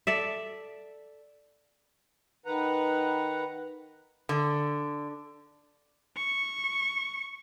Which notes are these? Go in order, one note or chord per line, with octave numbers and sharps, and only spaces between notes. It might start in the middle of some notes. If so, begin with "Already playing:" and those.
A4 D5 E5
D#3 B4 F#5 A#5
D3
C#6